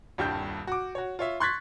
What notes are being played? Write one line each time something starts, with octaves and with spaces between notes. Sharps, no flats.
D#1 C2 G2 G5 A5 G6
F#4 D6
F#4 C#5
F4 C#5 E5
C6 C#6 F#6 G#6 A6 B6